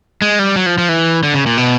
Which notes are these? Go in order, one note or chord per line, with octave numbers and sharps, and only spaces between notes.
G#3
G3
F#3
F3
F3
E3
D3
C#3
A#2
B2